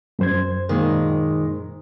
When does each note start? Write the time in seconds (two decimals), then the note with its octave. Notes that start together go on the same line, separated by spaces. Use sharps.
0.19 F#2 C5 G#6
0.69 A#2 D#3 G#3